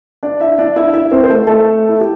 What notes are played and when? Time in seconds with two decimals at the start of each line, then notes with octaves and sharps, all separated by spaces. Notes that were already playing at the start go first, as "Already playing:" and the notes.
0.23 D4 D5
0.40 E4 E5
0.59 D4 D5
0.76 E4 E5
0.93 E4 E5
1.11 C4 C5
1.24 C5
1.29 A3 A4
1.47 A3 A4
1.89 E4
2.00 G4